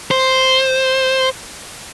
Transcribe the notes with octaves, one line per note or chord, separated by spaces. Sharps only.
C5